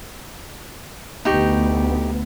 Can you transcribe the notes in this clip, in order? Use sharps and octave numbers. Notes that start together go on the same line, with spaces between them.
D2 B3 D#4 G4 C#6